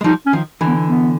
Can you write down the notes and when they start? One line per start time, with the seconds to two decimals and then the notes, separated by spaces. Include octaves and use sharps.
0.01 G#3
0.04 F3 G3 D#4
0.26 C#4
0.33 D#3 F3
0.61 D3 E3
0.67 B3
0.88 B3